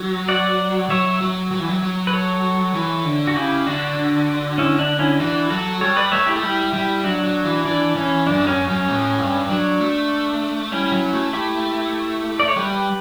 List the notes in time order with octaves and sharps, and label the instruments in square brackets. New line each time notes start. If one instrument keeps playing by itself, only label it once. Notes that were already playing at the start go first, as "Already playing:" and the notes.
Already playing: [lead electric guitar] F#3
[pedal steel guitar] D5 F#5
[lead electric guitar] F#3 [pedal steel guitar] C#5 E5
[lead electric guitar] F#3
F#3
E3
F#3
F#3
[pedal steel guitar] B4
A4 C#5
[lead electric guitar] E3
D3
[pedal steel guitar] F#4
[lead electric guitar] C#3 [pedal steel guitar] E4 G4
[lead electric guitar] D3 [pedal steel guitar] D4 F#4
[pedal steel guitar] C#4 E4
D4
C#4 E4
[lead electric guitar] E3 [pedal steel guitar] D4 F#4
[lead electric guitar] F#3 [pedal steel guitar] F#4 A4
[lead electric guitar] G3 [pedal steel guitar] A4 C#5
[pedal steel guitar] B4 D5
[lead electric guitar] A3 [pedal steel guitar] C#5 E5
[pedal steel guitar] E4 G4
A4
[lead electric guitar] G3 [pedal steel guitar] E4 G4
[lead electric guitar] G3 [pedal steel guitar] E4 G4
[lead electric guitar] F#3 [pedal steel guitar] D4 F#4
[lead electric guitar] F#3
E3
[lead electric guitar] E3 [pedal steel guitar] D4
[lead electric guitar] E3 [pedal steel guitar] C#4
[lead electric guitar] F#2 [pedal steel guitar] D4
[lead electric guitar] G2
[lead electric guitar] F#2 [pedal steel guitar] C#4
[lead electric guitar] F#2 [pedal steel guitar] C#4
[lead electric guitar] A2
G2
[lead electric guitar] F#3 [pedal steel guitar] D4
[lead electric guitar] A3
[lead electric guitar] G3 [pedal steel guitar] C#4 E4
[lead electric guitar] F#3
A3
[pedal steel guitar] E4 G4
D5
C#5
[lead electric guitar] G3 [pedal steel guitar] G4 B4